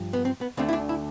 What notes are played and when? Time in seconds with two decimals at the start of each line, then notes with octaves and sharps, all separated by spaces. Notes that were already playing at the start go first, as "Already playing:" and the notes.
Already playing: G2 F3
0.13 B3
0.25 C4
0.41 B3
0.57 D2 D3 A3 C4
0.69 E4
0.73 D4
0.89 E4